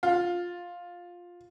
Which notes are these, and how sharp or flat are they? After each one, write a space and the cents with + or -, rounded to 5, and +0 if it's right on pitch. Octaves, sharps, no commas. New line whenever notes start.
F4 +10